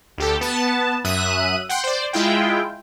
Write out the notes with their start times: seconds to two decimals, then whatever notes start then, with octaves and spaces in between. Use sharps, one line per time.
0.18 D2 G4 A4
0.41 B3 A5
1.05 F#2 E5 D#6 F#6 D#7
1.69 F#5 G5 C6
1.84 C5 D5
2.13 G#3 E4 F4 G5